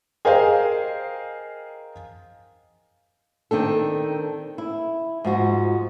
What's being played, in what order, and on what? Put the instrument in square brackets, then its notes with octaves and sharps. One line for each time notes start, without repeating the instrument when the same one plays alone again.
[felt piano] G#4 A#4 C5 D#5 F5 G5
[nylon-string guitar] D#3 C4 D4 A4
E4
G#2 F3 F#4